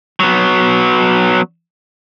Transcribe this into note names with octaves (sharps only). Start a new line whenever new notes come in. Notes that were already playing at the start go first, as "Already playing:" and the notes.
F#3 B3